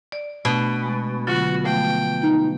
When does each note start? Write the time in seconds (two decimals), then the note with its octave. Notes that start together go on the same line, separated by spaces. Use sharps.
0.12 D5
0.45 B2 A3 D4
0.83 G#3
1.27 D3 F#3 F4 F#4
1.65 F3 A3 G5
2.23 D#4